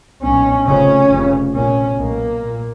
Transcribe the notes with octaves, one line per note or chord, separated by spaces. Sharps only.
B1 A#2 C#4
F1 F2 C#3 C#4
F1 F2 C#3
A#1 A#2 C#4
B1 B2 A#3
A#2